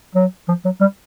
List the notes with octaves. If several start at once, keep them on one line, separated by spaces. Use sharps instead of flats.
F#3
F3
F#3
G3